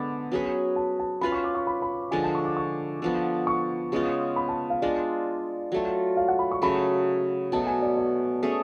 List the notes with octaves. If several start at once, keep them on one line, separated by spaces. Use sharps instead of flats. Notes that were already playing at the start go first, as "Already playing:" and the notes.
Already playing: D3 G#3 B3 B5 D6
F#3 C#4 G#4 B4
A5
A5
C#4 F4 B4 F5 B5
C#6
D6
C#6
B5
B5
D3 F3 G#3 G#5
A5
C#6
D6
C#6
D3 F3 B3
C#6
C#3 G#3 B3 F4
B5
A5
F5
G#3 D4 F4 D5
F#3 A3 F4
F5
F#5
B5
C#6
C#3 F#3 A3 B5
B2 F#3 A3 A5
G#5
D5
D5
A3 C#4 G#4